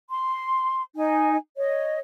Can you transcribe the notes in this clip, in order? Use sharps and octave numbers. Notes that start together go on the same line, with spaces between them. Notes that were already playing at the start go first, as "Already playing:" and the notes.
C6
D#4 G#5
C#5 D#5